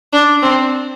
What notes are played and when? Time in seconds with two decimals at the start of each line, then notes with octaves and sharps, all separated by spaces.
0.13 D4
0.42 C4